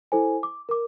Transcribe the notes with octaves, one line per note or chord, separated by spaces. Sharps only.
E4 A4 C5 G#5
D6
A#4 D6